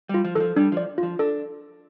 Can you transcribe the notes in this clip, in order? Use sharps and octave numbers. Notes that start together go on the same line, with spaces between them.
G3 F4
F3
E3 F3 A4
G3 D4
F3 D5
F3 F4
D4 A4